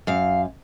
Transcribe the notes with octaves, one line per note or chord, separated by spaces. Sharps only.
F#2 F5